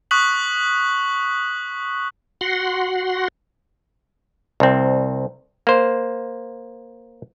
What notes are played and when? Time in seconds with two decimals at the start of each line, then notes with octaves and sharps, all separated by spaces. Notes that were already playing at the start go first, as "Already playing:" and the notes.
0.11 C#6 D#6 F#6 B6 F#7
2.41 F#4 F#5 C6
4.60 C2 C4
5.67 A#3 C5